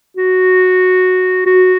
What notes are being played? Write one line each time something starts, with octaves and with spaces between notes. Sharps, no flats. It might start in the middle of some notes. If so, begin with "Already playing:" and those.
F#4
F#4